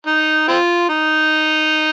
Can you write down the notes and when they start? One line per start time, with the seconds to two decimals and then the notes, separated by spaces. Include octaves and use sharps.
0.07 D#4
0.48 C4 F4
0.89 D#4